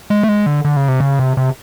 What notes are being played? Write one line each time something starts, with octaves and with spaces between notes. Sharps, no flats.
G#3
A3
G#3
D3
D3
C#3
C3
C#3
C3
C3